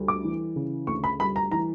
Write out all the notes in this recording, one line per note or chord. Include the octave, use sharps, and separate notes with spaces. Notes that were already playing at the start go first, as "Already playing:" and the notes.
Already playing: D2 G3
D6
E3
C#3
D2 C#6
B5
G3 B5
A#5
E3 A#5